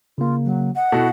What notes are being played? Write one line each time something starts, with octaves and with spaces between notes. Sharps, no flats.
C#3 A#3 F4
F#3
D#5 F#5
B2 E4 F#4 A4